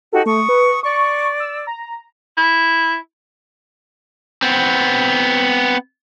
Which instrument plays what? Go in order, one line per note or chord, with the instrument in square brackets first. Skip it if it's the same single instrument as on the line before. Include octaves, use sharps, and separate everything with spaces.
[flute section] D#4 F#4 G4 [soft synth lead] A4
[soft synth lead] A3 [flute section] C#6 D#6
[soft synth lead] B4
[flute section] D5 [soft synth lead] C#6
[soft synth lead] E6
A#5
[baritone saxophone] E4
[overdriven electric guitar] B3 C4